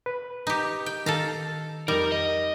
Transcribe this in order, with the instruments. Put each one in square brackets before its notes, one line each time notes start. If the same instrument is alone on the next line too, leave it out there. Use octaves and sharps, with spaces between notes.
[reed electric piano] B4
[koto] D#4 G4
G5
[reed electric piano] D#3 [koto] A4 F5 A#5
[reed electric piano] F2 D#4 [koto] G3 [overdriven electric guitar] A#4
[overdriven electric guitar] D#5